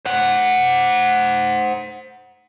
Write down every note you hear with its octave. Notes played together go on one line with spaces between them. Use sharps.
C5 F#5